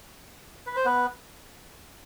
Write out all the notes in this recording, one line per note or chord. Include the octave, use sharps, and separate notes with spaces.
B4
C5
B3 B4